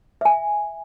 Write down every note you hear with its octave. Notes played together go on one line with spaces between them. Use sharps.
E5 G#5